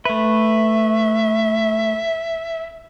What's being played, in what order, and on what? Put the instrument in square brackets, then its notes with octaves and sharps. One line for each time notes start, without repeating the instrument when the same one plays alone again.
[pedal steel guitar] A3 B4 [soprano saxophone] E5